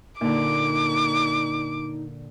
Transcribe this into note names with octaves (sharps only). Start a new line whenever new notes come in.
A#2 D3 D#4 D6